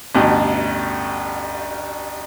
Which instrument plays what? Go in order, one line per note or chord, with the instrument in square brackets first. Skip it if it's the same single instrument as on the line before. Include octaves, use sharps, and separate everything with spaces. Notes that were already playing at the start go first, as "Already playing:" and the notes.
[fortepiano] A1 D2 G2 B2